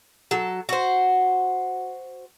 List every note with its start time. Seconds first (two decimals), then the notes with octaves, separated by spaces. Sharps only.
0.31 F#3 A4
0.69 F#4 C5